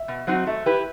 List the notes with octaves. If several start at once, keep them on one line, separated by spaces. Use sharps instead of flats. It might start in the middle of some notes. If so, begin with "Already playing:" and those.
Already playing: E5
B2
F#3 C4 D#4 F#4
A3 E5
E4 G4 B4